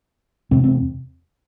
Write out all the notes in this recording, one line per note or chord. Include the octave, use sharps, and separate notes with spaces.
E2 C3 C4
C4